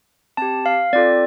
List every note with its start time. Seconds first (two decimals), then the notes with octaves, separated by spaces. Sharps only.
0.37 C4 G4 A5
0.66 F5
0.93 C4 F4 A4 D5